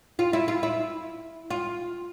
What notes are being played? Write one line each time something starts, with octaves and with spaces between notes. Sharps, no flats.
F4
E4
F4
E4
F4